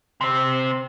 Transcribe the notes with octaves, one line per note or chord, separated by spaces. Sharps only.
C3 C4